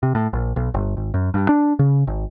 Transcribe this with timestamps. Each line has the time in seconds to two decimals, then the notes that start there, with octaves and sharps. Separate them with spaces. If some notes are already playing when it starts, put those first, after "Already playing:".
0.03 C3
0.15 A2
0.33 A#1
0.56 B1
0.74 G1
0.97 G#1
1.14 F#2
1.34 G2
1.49 D4
1.79 C#3
2.07 G#1